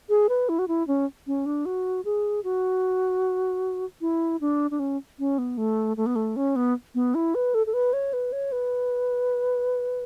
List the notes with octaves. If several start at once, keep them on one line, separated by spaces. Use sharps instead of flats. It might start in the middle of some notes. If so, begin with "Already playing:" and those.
G#4
B4
E4
F#4
E4
C#4
C#4
D4
F#4
G#4
F#4
E4
D4
D4
C#4
C#4
B3
A3
A3
B3
A3
C#4
B3
B3
E4
B4
A4
A4
B4
C#5
B4
C#5
B4